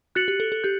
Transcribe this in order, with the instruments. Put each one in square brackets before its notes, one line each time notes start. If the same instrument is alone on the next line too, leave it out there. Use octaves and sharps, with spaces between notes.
[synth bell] F#4 [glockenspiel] F#6 A6 C#7 F#7
[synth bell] G4
A4
A4
[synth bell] G4 [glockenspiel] G6